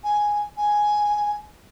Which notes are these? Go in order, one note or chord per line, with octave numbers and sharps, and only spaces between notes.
G#5
G#5